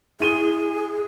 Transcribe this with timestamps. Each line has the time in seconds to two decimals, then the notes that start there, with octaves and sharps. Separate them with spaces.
0.20 E4 G#4 D#7 G7